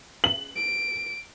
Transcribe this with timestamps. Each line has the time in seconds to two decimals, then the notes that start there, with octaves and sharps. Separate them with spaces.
0.24 F#7
0.56 D7